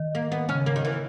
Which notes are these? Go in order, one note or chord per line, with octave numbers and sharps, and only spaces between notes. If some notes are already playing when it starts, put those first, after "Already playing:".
Already playing: D#3
A#3
B3
C#3 C#4
A#3
D#3
E3